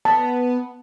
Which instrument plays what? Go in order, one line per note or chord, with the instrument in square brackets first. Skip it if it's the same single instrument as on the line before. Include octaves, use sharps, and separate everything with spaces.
[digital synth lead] B3 [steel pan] A5